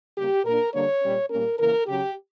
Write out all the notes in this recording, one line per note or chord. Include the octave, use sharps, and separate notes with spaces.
C#3 G3 A#3 G4
A#2 A#3 D4 A#4
D3 G3 A#3 D4 C#5
A#2 G3 C#4
A#2 G3 A#3 C#4 A#4
C#3 E3 A#3 C#4 A#4
C#3 F#3 C#4 G4